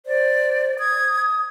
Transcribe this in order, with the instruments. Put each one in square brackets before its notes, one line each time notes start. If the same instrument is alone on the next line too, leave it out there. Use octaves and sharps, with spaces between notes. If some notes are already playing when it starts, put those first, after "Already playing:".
[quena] C5 [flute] D5
[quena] D#6 [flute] G#6